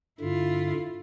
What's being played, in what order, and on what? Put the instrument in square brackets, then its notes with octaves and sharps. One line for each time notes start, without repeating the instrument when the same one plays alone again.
[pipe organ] G2 D3 [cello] E4 F4